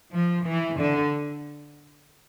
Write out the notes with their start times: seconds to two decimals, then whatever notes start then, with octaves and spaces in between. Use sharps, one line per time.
0.12 F3
0.45 E3
0.77 D3